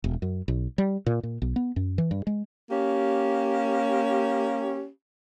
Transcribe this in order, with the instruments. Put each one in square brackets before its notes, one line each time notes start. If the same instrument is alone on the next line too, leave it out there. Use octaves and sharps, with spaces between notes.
[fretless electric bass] E1
F#2
B1
G3
A#2
A#2
B1
B3
F#2
E3
G2
G#3
[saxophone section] A#3 C#4 G4